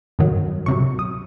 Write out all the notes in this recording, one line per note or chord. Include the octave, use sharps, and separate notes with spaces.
G2 D#3 F#3
C#2 C3 D#3 F#3 C#6
D#6